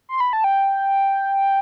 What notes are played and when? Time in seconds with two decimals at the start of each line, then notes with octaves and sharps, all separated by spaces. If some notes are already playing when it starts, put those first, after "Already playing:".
0.09 C6
0.20 B5
0.33 A5
0.44 G5